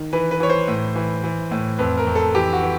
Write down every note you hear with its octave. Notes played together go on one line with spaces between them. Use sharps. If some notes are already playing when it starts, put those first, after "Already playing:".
Already playing: D#3
E3 B4
B4
E3 C#5
C5
A2
E3
E3
A2
F2 B4
A#4
F2
A4
E3 G4
F#4
E3